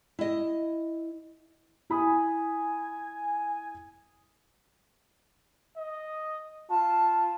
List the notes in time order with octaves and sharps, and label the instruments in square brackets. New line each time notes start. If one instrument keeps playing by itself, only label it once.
[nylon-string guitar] E4 D#5
[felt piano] E4 B5 D#6 [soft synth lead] G#5
[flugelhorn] D#5
[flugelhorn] F4 [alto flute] A5